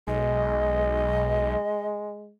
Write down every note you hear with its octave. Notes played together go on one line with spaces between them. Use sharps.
B1 G#3 D#5